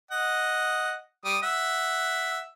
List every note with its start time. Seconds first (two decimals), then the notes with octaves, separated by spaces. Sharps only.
0.11 D#5 F#5
1.25 G3 D#6
1.42 E5 F#5